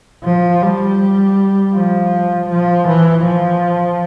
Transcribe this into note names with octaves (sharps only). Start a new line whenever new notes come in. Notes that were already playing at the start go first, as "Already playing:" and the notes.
F3
G3
F3
F3
E3
F3